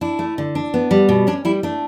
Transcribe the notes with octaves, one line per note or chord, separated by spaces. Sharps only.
D4 E4
A3
D3
D4
B3
G3
B2
C#4 D4
G3 E4
A3 D4